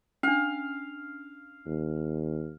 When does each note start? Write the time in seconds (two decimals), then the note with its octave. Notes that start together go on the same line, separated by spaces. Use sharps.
0.23 C#4 D4 F5
1.66 D#2